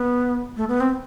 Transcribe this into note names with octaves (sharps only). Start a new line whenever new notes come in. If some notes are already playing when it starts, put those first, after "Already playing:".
Already playing: B3
A3
B3
C4